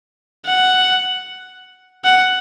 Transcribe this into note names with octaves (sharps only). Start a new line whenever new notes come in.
F#5
F#5